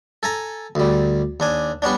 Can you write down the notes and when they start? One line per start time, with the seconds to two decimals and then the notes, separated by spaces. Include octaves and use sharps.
0.23 A4 G#5 A#5
0.75 D2 G3
1.40 D#2 D4 G#5
1.82 G3 B3 C#4 D4